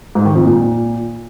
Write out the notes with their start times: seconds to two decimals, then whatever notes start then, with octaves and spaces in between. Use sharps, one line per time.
0.15 G#2
0.25 D#3
0.35 F2
0.45 A#2